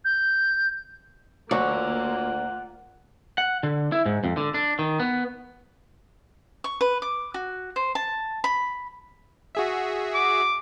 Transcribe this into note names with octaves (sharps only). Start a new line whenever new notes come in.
G6
D2 F#3 A#3 F4 F#4 D5 F#5
F#5
D3
E4
G#2
F2
D3
D4
D#3
B3
C#6
B4
D6
F#4
C5
A5
B5
F#4 G#4 E5
D6